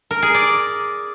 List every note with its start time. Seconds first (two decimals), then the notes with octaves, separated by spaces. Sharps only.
0.11 A#4
0.23 G#4
0.34 D5